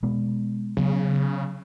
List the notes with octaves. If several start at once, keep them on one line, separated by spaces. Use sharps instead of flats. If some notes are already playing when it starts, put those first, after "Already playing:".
B2 G#3 B3
C#3 F#3 B3